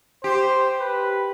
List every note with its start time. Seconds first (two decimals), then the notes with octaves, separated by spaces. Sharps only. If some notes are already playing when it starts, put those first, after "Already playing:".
0.24 G4 C5
0.80 B4